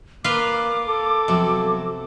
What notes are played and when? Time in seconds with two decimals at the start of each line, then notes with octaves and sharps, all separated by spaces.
0.24 A#3 F4 B4 F5 D6
0.86 A4
1.28 C3 F3 F#3 B3